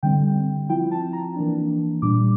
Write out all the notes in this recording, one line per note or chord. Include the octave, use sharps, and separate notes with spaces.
D3 G3 C4 G5
F3 C4 E4 G5
A5
A#5
E3 A#3 D4
A#2 G3 D4 D6